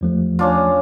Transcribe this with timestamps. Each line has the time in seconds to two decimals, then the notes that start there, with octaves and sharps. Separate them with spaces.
0.01 E2 F3 A3
0.39 C#4 D4 F4